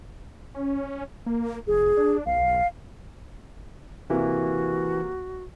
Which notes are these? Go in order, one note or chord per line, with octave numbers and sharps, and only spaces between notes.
C#4
A#3
F1 G#4
D4
B1 F5
C3 E3 A#3 F#4